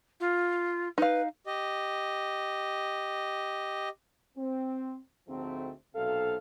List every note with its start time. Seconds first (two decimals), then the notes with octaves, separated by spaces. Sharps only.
0.20 F4
0.98 D#4 B4 F5
1.47 G4 D#5
4.37 C4
5.29 D2 G#2 F3 A3 C4
5.95 B1 C3 A4 F5